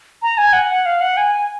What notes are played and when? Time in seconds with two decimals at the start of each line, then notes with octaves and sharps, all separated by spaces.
0.22 A#5
0.38 G#5
0.53 F#5
0.85 F5
1.01 F#5
1.17 G#5